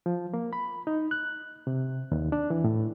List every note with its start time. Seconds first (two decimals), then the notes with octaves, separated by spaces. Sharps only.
0.06 F3
0.34 A#3
0.53 B5
0.87 D#4
1.11 F#6
1.67 C3
2.12 D#2
2.32 D4
2.50 E3
2.64 A2